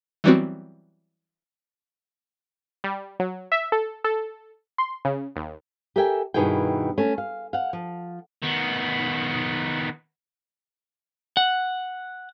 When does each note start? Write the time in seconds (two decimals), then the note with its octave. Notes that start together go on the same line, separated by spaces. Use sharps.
0.24 E3 F#3 G3 B3 C4 F#4
2.84 G3
3.20 F#3
3.52 E5
3.72 A4
4.04 A4
4.78 C6
5.05 C#3
5.36 D#2
5.96 G4 A4 A#4 E5 G5 G#5
6.34 G2 B2 D#3 E4 G#4 G5
6.98 A3 C#4
7.18 F5
7.53 F5 F#5
7.73 F3
8.43 D#3 B3
11.37 F#5